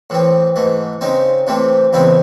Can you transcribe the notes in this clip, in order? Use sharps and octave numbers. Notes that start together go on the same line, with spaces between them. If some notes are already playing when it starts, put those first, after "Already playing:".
A2 E3 C4
G#2 E3 A3
C#3 G#3 C4 D#4
C3 E3 A3 C4
E2 C#3 G#3 C4 E4